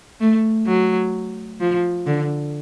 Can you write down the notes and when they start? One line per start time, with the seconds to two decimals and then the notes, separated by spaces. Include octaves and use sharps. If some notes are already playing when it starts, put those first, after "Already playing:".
0.20 A3
0.67 F#3
1.61 F3
2.07 D3